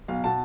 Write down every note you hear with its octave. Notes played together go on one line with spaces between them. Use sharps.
B1 F5
B2 A5